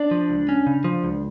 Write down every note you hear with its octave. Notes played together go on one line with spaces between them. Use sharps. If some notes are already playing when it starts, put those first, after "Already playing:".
Already playing: D4 D5
F3
C#2
C#4
C#3
F3
C#2